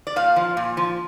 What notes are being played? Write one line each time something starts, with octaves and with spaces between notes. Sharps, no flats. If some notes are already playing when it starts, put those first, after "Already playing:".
D5
A#2 F5
F3
A#2
F3